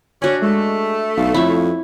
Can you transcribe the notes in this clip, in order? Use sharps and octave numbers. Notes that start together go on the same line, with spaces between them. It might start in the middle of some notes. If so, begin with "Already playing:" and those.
C#4 D4 F#4 D5
G#3 A3
B1 F5
F2 E4 C#5